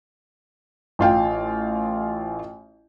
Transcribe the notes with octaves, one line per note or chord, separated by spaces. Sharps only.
A1 F4 F5 G5